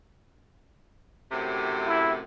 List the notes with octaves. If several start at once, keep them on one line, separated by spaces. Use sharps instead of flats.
F#2 A2 C3
E4